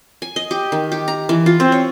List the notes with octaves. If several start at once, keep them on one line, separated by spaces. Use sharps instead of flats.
G#5
D#5
G4
D#3
G4
A#5
E3
F4
C4
C#5